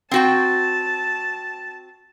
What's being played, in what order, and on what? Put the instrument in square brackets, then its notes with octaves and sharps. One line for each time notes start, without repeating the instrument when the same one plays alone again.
[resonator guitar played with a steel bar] C4 F#4 G5 [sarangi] A5